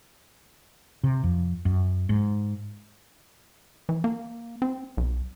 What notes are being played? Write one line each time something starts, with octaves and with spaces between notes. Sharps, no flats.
C3
F2
F#2
G#2
E3
A#3
C4
B1